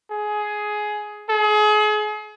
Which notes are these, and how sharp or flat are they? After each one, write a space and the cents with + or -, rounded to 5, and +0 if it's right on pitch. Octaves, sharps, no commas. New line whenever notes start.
G#4 +15
G#4 +35